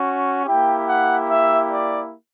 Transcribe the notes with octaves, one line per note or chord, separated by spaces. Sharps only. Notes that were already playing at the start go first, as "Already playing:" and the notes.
Already playing: C#4 F#4
A#3 E4 G4 G5
F#5
E5
D5